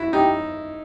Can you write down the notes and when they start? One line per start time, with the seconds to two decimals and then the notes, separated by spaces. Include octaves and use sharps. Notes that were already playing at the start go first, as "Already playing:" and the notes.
Already playing: E4 F#4
0.13 D#4 G4